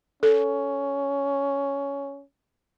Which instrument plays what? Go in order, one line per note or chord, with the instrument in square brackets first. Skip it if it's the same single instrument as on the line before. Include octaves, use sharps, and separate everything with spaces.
[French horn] C#4 [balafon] A4